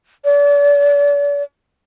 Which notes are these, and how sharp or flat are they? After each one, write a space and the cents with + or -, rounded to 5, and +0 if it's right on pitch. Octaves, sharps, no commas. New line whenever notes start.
D5 -40